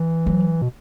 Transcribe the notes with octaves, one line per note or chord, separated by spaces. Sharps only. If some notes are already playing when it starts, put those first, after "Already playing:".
Already playing: E3
F#3
B2